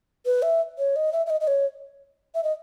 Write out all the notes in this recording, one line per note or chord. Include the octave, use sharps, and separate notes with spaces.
B4
E5
C#5
D#5
E5
E5
D#5
D#5
C#5
E5
D#5